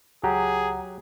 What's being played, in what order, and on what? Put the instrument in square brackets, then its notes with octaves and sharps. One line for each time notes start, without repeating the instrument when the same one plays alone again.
[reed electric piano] C#2 F#5 A#5 [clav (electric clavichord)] F#3 G4 [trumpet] G#4